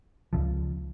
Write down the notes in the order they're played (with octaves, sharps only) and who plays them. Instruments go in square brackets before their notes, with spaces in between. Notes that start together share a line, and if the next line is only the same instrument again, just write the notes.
[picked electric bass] C#2 C#3 F3